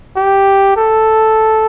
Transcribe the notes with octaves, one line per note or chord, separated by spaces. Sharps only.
G4
A4